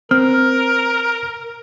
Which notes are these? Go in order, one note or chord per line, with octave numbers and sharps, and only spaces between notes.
C4 A#4 F6